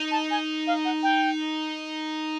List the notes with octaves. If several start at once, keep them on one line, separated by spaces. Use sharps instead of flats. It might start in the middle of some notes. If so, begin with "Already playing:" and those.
Already playing: D#4
A5
G#5
F5
F#5
G5